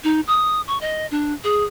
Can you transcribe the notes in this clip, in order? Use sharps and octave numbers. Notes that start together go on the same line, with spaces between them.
D#4
D#6
C#6
D#5
D4
G#4